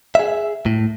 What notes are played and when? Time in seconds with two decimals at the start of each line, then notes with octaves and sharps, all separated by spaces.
0.15 G#4 E5
0.66 A2